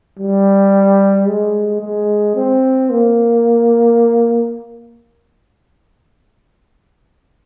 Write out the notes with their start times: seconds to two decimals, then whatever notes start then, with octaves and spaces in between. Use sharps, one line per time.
0.19 G3
1.27 G#3
1.81 G#3
2.35 C4
2.90 A#3